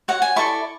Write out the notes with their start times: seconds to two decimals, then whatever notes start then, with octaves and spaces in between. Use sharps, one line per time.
0.08 F#4 C#5 F#5
0.22 G#5
0.36 E4 A4 D5 C#6